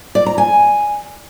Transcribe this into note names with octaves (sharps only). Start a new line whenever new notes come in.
D5
A#5
G#5